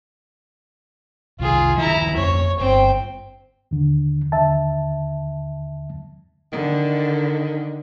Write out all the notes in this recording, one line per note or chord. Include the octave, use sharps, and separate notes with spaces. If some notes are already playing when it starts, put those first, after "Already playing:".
C2 C3 D#3 F4 G#4
D1 D#3 F3 E4 A#5
F2 A#3 C#4 C#5
G1 C4 G5
D#2 D3
D#2 D3 E5 A5
D3 D#3